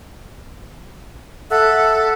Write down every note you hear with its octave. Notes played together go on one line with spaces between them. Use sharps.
A4 E5 F#5